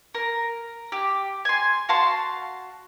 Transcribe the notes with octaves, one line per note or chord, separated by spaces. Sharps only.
A#4
G4
G#5 C6
F#4 F5 A5 C6